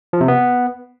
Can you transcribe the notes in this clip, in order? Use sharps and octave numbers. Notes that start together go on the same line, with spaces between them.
F3
C3
B3